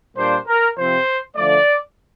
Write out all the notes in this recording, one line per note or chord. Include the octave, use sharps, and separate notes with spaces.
A#2 G3 A#3 D4 C5
A#4
C3 F3 C4 C5
D3 F3 A3 D5